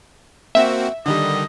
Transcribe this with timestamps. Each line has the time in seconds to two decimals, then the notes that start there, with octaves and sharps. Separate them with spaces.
0.55 A#3 C4 F#4 E5
1.06 D3 D#3 G3 D#5